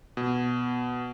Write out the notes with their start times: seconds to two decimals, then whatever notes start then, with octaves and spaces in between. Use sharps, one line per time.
0.17 B2